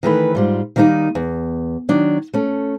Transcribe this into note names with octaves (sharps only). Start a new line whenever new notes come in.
D#3 E3 A3 B4
G#2 G3 F4
D#3 G3 A#3 B3 D#4
E2
D#3 F#3 D4
A3 C#4